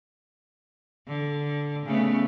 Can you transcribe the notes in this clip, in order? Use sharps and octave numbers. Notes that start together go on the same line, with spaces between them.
D3
C#3 A3 B3